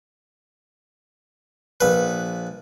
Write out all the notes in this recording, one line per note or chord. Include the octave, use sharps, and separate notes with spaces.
A#1 B4